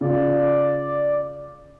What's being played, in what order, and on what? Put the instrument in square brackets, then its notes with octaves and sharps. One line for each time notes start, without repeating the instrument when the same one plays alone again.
[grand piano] C#3 F4 [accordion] D5